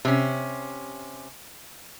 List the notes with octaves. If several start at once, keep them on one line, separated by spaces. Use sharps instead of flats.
C3 C#4